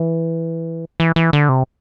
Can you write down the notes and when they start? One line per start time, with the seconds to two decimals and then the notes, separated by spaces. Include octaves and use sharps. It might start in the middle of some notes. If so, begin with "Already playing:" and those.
Already playing: E3
1.00 E3
1.16 E3
1.33 D3
1.49 C3